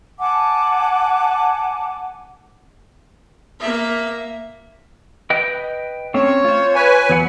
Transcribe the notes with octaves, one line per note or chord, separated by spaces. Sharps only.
F#5 G#5 A5 D6
A#3 E5
B4 D#5 G5
A3 C4 C#4 C#5
F4 C5
B4 G#5
E2 F#3 F#5